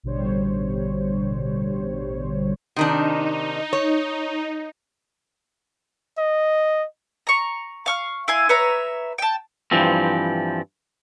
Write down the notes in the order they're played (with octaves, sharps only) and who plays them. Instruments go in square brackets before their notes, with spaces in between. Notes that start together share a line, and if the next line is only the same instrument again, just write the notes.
[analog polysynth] A1 B2 D3 G3 C5 C#5
[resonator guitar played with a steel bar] C3 D#3 D4 [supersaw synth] D#4
[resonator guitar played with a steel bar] C#5
[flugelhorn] D#5
[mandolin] A#5 C#6
F5 C#6 F6
E4 F5 G#5 C6
B4 C#5 E5 A#5
G5 A5
[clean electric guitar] G2 E3 F3 C4